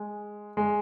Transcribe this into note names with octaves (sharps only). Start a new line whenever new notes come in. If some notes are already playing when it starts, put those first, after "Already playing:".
Already playing: G#3
G#3